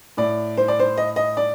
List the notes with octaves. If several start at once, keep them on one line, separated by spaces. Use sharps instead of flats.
A2 D5
C5
D5
C5
D#5
D#5
D5